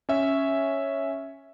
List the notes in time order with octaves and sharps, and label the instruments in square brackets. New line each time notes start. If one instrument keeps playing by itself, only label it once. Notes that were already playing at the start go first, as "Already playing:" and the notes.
[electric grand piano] C#4 C#5 E5